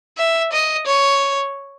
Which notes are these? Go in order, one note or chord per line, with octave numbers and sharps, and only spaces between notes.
E5
D#5
C#5